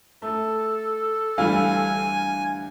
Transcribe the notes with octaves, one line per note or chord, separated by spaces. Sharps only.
A3 A4
D2 E3 G3 F5 G#5